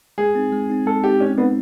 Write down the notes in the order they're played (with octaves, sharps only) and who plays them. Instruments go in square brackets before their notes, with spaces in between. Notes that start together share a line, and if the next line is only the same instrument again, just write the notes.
[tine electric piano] G#3 [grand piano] G#4
[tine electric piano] C4 D#4
G#3
C4 D#4
[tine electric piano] G#3 [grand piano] A4
[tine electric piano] C4 D#4 [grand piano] G4
[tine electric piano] G#3 [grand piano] C#4
[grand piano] B3 [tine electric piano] C4 D#4